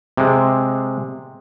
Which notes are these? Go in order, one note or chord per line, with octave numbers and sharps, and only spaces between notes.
C3 G#3